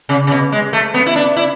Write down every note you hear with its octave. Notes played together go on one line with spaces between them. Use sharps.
C#3
C#3
B2
G#3
A3
B3
E4
D4
E4